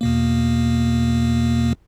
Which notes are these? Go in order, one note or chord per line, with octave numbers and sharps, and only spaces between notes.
E2 B2 A#3